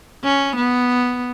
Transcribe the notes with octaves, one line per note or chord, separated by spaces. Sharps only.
C#4
B3